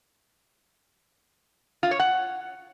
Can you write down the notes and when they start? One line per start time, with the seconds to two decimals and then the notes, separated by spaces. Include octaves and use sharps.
1.83 F4
1.91 C#5
1.99 F#5